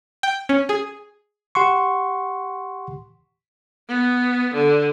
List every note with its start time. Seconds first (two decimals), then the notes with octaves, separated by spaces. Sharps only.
0.23 G5
0.49 C#4
0.69 G#4
1.55 G4 F#5 C6 C#6
3.88 B3
4.54 D3